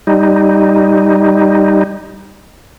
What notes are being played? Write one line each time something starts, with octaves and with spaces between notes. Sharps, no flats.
G3 D#4